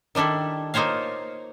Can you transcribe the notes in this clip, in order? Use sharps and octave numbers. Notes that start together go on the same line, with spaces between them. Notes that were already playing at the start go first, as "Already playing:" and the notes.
D#3 G3 D4 E4 A4
A#3 D#4 F4 C5 C#5 F5